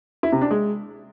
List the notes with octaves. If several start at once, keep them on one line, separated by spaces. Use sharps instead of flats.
E4
C3
D4
G#3